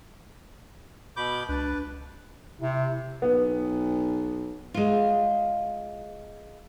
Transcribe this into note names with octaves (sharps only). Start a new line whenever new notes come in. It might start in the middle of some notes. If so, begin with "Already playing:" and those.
B2 B5 D6 G6
C#2 D4 B4
C3 E4
B1 B3
G#3 F4